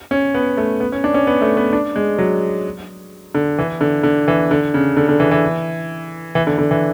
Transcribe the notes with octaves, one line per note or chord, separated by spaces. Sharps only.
C#4
B3
A3
B3
C#4
D4
C#4
B3
A3
B3
D4
G#3
F#3
D3
E3
D3
D3
E3
D3
C#3
D3
D3
E3
E3
E3
D3
D3
E3